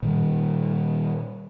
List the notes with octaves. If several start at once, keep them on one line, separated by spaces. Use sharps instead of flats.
A#2 D#3 G3